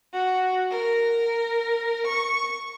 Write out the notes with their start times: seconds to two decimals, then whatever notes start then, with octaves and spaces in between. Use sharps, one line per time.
0.14 F#4
0.71 A#4
2.07 C#6